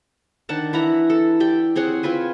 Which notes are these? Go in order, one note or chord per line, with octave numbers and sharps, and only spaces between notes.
D#3 D4 F#5 A5
E3 E4 F#5 A#5
A4
G4 D5 G5
C4 G#4 C#5 F#5
C4 F4 B4 G#5